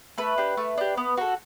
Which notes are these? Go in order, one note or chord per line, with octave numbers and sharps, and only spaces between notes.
A3 B4
D4 G4
A3
D4 G4
B3
F#4 A4